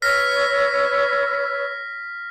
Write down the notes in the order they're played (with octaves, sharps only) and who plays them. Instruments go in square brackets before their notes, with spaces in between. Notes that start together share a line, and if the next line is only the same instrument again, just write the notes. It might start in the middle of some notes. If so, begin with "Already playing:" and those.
[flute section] B4 C#5 E6 [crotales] F6 A#6 B6